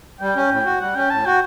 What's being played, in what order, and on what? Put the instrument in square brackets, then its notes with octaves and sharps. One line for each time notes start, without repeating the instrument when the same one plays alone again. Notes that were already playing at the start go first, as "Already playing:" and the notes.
[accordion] G3 [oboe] G5
[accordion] C#4
A2
F#4
[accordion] G3 [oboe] F#5
[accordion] C#4 [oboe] G5
[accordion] A2 [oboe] A5
[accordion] F#4 [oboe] G5